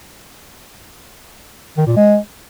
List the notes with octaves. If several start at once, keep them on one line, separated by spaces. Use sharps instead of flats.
D#3
A#2
G#3